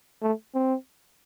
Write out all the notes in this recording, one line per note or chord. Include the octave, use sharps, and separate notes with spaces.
A3
C4